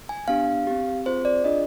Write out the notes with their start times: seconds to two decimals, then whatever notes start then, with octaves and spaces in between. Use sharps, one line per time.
0.09 G#5
0.28 B3 D4 G4 F5
0.67 C4 G4
1.06 C4 F4 G#4 C5
1.25 D5
1.44 D4 F4 G#4 D#5